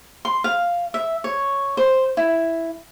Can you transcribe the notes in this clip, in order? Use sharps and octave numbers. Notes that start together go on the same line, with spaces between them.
C6
F5
E5
C#5
C5
E4